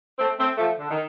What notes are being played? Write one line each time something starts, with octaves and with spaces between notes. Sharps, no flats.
A3 C4
A3 C4
F3 A3
D3
D#3